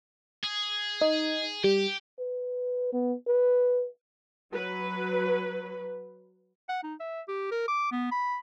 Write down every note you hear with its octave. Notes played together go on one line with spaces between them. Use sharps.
G#4
D#4
G3 G4
B4
B3
B4
F#3 B4
F#5
D#4
E5
G4
A#4
D6
B3
B5